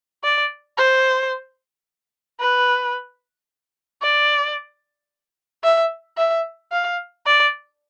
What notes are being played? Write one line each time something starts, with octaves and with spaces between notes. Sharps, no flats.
D5
C5
B4
D5
E5
E5
F5
D5